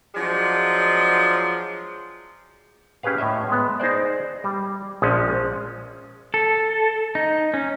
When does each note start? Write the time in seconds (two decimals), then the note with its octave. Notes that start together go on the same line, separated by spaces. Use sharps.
0.15 F3 F#3 G#3 D4 F4
3.03 C#4 G4 G#4 B4 F5
3.18 A2 C#5 D#5 E5
3.48 G#3 B3
3.80 D#4 G#4 C5 D5
4.44 G3
5.02 A#1 F3 G#3 C#4
6.34 A4
7.15 D#4
7.54 C#4